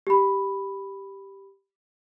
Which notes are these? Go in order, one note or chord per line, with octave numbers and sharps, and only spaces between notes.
G4 B5